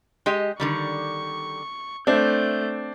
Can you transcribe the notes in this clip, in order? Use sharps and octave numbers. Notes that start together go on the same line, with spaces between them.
G#3 G4 D#5
D3 D#3 G3 C#6
A3 C4 D4 E5 G6